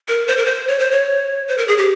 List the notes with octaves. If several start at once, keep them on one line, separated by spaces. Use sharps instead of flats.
A#4
C5
A#4
C5
C#5
C5
C#5
C5
A#4
G#4
G4